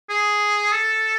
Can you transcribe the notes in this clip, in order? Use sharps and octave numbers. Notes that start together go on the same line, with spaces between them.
G#4
A4